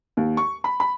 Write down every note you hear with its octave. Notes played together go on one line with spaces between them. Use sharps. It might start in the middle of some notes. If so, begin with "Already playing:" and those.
D#2
C#6
B5
B5